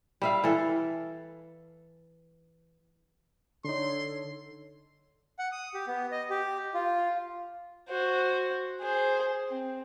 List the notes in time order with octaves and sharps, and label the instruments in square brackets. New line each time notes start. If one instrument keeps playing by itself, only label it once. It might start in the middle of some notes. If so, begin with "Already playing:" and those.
[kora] G3 E5 F5
E3 A4
[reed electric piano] D3 D#4 [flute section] A4 C#5 [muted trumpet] C6
[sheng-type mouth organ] F#5
D#6
G4
B3
D#5
G4
F4
[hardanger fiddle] F#4 C5
G#4 C5
C4